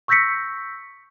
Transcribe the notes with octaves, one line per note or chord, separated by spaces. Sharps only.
C#6 E6 G6 A#6 B6 C#7